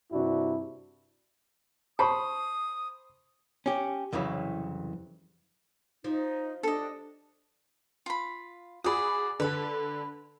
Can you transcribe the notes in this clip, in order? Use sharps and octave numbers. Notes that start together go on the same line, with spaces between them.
G2 C3 D4 E4 F#4
C5 A5 B5 C#6 D#6
C#4 G4
C2 F2 C#3 E3 F#3
F3 D#4
D4 G4 A4 D#5
F4 B5
F#4 G#4 D5 B5 D#6
D3 A4 B4 B5